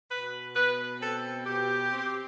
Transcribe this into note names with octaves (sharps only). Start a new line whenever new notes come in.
B2 B4
B2 B4
C4 A4
B2 G4
C4